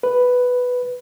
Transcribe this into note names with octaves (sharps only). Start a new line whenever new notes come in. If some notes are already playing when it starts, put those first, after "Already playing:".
B4